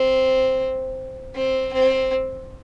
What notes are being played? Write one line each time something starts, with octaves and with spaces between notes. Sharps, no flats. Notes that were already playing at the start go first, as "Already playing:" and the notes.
Already playing: C4
C4
C4